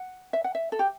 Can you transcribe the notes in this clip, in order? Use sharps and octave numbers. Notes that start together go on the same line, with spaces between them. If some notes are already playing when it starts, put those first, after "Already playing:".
Already playing: F#5
E5
F#5
E5
A4
G4